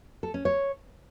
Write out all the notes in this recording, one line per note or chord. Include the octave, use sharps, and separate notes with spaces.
A4
C#4
C#5